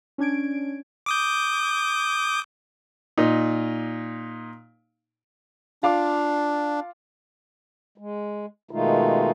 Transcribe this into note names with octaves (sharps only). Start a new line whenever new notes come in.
C#4 D4 G#6 D7
D6 D#6 G6
A#2 D#4
D4 F4 F5 D6
G#3
B2 D#3 G#3 A3 D#4 F4